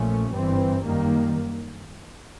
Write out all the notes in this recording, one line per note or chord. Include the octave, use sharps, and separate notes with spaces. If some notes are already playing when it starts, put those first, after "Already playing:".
Already playing: A#1 A#2 F3 A3 C#4
G1 G2 E3 G3 C4
F#2 D#3 G3 A#3